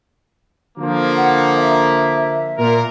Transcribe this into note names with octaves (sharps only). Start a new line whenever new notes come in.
D3 F3 A#3
F#5
E5
A#2 A#4